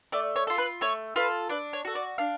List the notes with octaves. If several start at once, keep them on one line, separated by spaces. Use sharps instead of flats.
A3 D5
C#5
F4 A4
B4
A3 C#5
F4 A4 B4
D4 B4
C#5
F#4 A4
D5
D4 F5